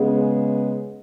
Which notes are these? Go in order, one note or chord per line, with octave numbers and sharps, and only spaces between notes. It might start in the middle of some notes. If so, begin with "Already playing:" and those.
Already playing: C#3 G#3 B3